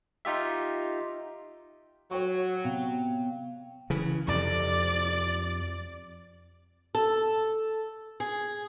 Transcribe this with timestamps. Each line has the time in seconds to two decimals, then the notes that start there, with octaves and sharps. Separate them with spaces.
0.25 D#4 F4 G4 E5
2.11 F#3 C#5 G5 C#6
2.64 C3 B3 F5 G5
3.90 C#3 E3
4.28 F2 C3 D5
6.95 A4
8.20 G#4